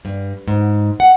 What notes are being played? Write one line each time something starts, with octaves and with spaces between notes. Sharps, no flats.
G2
G#2
F#5